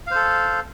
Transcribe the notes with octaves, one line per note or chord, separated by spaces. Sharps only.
A4 C5 F5